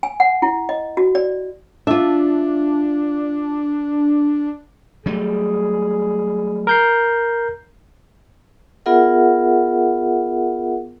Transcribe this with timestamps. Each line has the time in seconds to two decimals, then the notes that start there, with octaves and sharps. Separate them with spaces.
0.03 G#5
0.20 F#5
0.42 E4
0.69 D#5
0.97 F#4
1.15 D5
1.87 D4 F4 E5
5.06 F#3 G3 A3 G#4
6.67 A#4 G6 C7
8.86 B3 F4 G#4 A#4 E5 F#5